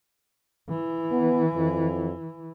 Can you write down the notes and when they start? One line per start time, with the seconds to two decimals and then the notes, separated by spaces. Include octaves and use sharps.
0.69 E3
1.11 B3
1.55 F2